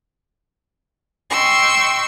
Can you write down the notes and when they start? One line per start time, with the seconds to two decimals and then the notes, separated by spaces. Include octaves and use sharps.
1.30 D#5 G5 C6 C#6 E6